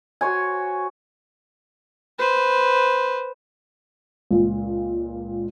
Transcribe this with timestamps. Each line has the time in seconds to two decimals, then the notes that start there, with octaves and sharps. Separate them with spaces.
0.21 F#4 C5 C#5 G#5
2.19 B4 C5
4.31 C#2 A#2